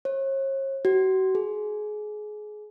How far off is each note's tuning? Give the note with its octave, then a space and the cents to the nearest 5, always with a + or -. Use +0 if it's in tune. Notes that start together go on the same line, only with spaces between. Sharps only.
C#5 -40
F#4 +35
G#4 +25